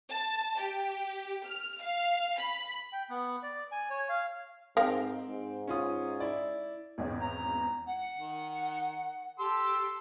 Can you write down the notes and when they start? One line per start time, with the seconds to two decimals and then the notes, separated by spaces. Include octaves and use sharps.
0.10 A5
0.58 G4
1.46 F6
1.81 F5
2.38 B5
2.93 G5
3.10 B3
3.43 D5
3.72 G#5
3.90 C#5
4.09 F5
4.77 G#2 C4 A#4 F5 G5
5.27 G#2
5.68 C#4 F4 D#6
6.20 E4 D5
6.98 G#1 E2 C#4
7.21 A#5
7.87 F#5
8.18 D#3
9.39 G4 A4 C6 E6